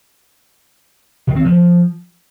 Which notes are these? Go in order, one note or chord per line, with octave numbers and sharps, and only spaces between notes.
D#3
C4
F3